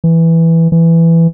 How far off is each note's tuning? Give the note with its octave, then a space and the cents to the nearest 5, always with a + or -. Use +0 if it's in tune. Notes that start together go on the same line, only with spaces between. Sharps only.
E3 +0
E3 +10